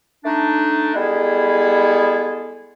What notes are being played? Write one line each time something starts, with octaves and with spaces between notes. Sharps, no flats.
A3 D4 D#4
G3 G#3 B3 E4 G#4 A4